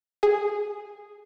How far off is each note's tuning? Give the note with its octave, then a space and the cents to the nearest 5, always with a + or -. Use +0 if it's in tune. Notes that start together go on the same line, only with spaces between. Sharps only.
G#4 -5